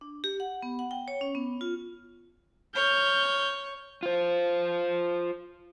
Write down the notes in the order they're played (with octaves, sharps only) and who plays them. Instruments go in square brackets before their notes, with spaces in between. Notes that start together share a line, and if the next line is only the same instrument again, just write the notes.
[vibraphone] D4
G4
F#5
B3
F#5
G5
C#5
C#4
B3
F4
[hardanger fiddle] C#5 [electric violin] F6 G6
[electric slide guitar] F4 C5